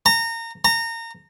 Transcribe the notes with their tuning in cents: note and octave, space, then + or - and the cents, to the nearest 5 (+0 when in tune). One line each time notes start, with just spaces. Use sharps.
A#5 -25
A#5 -25